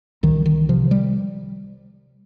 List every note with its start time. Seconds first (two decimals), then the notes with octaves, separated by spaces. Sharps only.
0.23 C2 D#3
0.46 D#3
0.69 C3 F3
0.91 G3